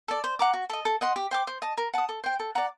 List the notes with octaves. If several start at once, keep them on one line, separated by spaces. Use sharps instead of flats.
A4 D5
C5
F#5 A#5 D6
F#4
A4 D#5
A4
D#5 F#5 C6
G4
C5 G5 D6
C5
D#5 A5
A#4
F#5 A5 D#6
A4
C5 G5
A4
D5 F#5 A#5